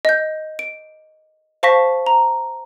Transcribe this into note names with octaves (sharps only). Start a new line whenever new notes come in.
D#5 G6
D7
C5 F5 A5 C#6 A#6 B6
A#5